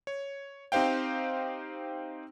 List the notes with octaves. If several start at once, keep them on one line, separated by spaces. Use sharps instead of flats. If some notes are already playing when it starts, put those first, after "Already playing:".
C#5
C4 D#4 G4 C5 F5 G5